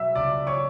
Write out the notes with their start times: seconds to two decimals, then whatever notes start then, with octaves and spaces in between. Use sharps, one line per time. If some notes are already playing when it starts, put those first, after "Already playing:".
Already playing: B2 F#3 E5 E6
0.15 C#2 D5 D6
0.47 C#5 C#6